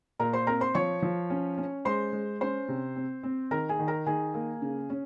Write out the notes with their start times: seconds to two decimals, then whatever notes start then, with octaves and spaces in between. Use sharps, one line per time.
0.19 A#2 A#4 A#5
0.33 C5 C6
0.47 C4 A#4 A#5
0.61 C5 C6
0.75 F3 C#5 C#6
1.02 F3
1.30 C#4
1.58 C#4
1.85 G#3 C5 C6
2.13 G#3
2.41 C#4 C5 C6
2.68 C3
2.96 C4
3.23 C4
3.51 D#3 A#4 A#5
3.69 G#4 G#5
3.79 D#3
3.88 A#4 A#5
4.06 D#3 G#4 G#5
4.34 A#3
4.62 C#3
4.90 C#4